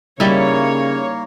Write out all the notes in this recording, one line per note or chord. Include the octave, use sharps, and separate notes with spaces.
C#3 G3 A#3 D#4 E4 C#5